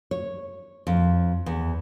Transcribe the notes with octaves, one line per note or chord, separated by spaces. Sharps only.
C#5
F2
E2